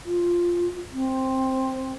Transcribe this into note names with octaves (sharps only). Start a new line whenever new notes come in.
F4
C4